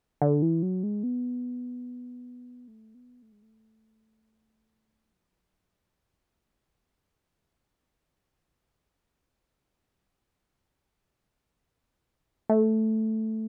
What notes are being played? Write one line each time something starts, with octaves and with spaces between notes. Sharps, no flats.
D3
E3
F#3
G#3
B3
A3
B3
A3
G#3
A3
F#3
G#3
F#3
G#3
A3
B3
A3